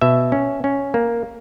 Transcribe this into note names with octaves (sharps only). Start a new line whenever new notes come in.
B2 E5
C#4
C#4
A#3